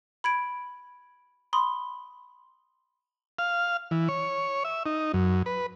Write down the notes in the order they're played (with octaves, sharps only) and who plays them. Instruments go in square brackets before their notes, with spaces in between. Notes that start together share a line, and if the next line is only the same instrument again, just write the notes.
[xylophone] B5 G#6 D7
B5 C6 D#6
[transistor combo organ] F5
E3
C#5
E5
D#4
F#2
B4